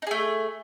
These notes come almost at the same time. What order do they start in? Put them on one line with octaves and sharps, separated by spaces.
D#4 G#4 A3